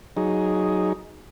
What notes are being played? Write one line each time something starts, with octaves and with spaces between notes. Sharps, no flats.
F#3 D#4 G#4